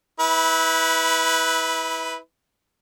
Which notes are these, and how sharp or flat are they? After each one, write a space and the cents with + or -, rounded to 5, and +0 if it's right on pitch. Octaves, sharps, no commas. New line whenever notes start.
E4 -25 B4 +0